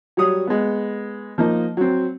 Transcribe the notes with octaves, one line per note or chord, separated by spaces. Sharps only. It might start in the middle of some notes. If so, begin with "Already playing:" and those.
F#3 G3 C#5 D#6
G#3 B3
F3 A#3 D#4 D#5
F#3 C4